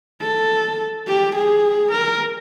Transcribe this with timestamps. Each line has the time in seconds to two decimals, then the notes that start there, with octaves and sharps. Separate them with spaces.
0.21 A4
1.07 G4
1.35 G#4
1.92 A#4